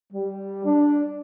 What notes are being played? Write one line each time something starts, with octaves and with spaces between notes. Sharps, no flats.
G3
D4